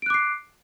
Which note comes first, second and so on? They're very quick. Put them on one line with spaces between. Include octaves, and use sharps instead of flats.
D7 F#6 D6 C7